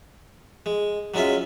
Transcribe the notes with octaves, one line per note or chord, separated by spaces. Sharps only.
G#3
F#3 G#3 C#4 F4 E5